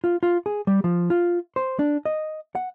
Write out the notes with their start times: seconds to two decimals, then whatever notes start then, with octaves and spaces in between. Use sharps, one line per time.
0.04 F4
0.23 F4
0.46 G#4
0.67 G3
0.84 F3
1.10 F4
1.56 C5
1.79 D4
2.05 D#5
2.55 F#5